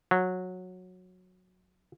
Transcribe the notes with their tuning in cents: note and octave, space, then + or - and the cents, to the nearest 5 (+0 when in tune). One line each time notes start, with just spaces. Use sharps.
F#3 -15